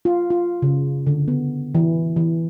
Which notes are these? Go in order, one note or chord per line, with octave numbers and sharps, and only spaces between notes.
F4
F4
C#3
D3
B3
E3
E3